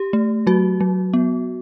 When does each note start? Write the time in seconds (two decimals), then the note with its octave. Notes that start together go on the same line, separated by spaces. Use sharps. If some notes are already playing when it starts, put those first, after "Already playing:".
Already playing: G4
0.13 A3
0.47 F#3 F#4
0.80 F#3
1.14 B3